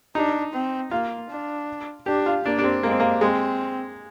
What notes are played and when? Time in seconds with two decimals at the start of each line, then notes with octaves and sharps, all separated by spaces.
0.15 D4 D#4
0.53 C4
0.91 A#3 F4
1.30 D4
2.06 D4 G4
2.26 F4
2.45 A#3 D4
2.59 D4
2.64 C4
2.83 G#3 A#3
2.91 C4
3.00 A#3
3.21 G#3 C4